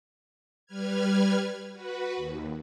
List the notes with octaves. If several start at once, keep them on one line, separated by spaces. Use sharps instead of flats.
G3 B4 F6 G#6
F#4 B4
D#2